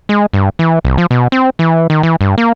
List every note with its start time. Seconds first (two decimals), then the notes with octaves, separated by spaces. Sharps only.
0.09 G#3
0.33 G2
0.59 E3
0.85 C2
0.98 F3
1.11 B2
1.32 C4
1.59 E3
1.90 D#3
2.03 E3
2.21 G2
2.38 A#3